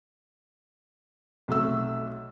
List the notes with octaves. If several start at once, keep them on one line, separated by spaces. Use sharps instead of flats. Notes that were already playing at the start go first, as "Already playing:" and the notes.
B1 C3 A3 E6